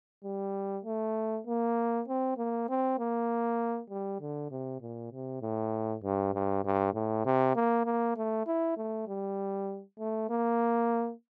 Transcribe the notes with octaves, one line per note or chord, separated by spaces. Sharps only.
G3
A3
A#3
C4
A#3
C4
A#3
G3
D3
C3
A#2
C3
A2
G2
G2
G2
A2
C3
A#3
A#3
A3
E4
A3
G3
A3
A#3